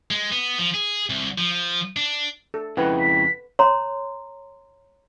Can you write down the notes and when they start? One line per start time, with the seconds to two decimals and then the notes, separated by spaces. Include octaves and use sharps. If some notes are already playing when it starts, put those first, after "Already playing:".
0.11 G#3
0.32 B3
0.58 F3
0.74 G#4
1.10 C2
1.38 F3
1.96 D4
2.54 A4
2.77 F2 C#3 G#3 E4 B4 F#5 G5
2.99 B6
3.59 C#5 A#5 C6